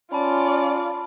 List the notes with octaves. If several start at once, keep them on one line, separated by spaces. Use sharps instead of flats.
C#4 F4 D5 A5 B5